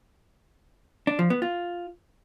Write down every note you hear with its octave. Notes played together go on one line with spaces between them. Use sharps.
D4
F3
B3
F4